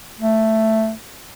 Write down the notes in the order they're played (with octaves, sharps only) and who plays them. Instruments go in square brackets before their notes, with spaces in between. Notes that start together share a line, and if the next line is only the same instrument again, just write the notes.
[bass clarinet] A3